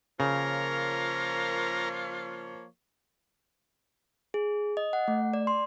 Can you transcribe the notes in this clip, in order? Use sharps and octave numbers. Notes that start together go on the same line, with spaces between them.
C#3 F3 A#3 F4 A#4 C#5
G#4
D#5
F#5
A3
D5
C6